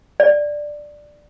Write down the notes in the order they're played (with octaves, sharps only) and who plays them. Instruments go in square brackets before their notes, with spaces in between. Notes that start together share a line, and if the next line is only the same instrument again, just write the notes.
[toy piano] D5